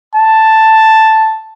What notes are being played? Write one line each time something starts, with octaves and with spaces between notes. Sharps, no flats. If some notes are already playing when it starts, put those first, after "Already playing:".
A5